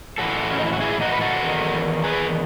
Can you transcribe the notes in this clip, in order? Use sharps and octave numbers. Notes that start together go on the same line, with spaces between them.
A2 E3 F#4 A4
C#4
D#4
E4
F#4
E4 G#4
E4
D#4 F#4
B4
F#4 A4
E2 D#3
G#4 B4